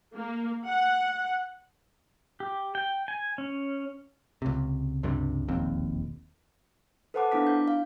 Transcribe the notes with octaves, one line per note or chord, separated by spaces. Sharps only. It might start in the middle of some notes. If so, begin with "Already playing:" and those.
A#3
F#5
G4
G5
G#5
C#4
C#2 C3
C#2 G2 C3
E1 A#1 D#2 C4
A4 B4 C5 F#5 A5 D6
B3 D4 E4 D6 B6
G6
F5